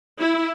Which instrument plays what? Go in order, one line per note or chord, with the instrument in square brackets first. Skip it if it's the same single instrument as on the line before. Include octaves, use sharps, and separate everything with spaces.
[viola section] E4